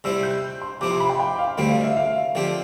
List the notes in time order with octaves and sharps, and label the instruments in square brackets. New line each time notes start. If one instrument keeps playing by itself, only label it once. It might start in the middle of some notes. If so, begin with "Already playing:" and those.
[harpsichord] C3 G3 C4 E4 [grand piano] E6
[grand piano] G6
C6
[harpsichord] C3 F3 C4 E4 [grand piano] D6
[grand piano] C6
B5
G5
G5
F5
[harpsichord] D2 D3 G3 C4 [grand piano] F5
[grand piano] F5
E5
F5
[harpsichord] D3 F3 C4 G4